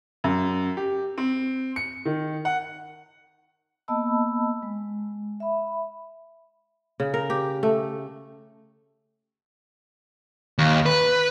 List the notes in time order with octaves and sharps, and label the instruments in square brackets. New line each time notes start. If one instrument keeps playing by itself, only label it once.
[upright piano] F#2
G4
C4
C#7
D#3
F#5
[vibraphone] A#3 B3 D#5 A5 B5 E6
G#3
E5 B5
[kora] C#3
A#4
G4
A3
[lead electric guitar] D#2
B4